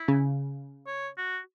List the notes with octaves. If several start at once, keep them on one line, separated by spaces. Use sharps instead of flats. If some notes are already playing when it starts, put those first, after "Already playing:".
Already playing: E4
C#3
C#5
F#4